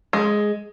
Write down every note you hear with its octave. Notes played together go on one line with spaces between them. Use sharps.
G#3